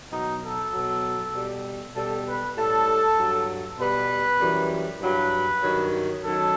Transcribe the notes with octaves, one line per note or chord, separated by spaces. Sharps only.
B2 F#3 D#4
A4
B2 F#3
B2 G3
B2 G3 A4
B4
A2 G3 A4
G2 F#3
B2 G3 B4
F#2 E3 G3
G2 F#3 B4
G2 D#3 F#3
F#2 D#3 F#3 A4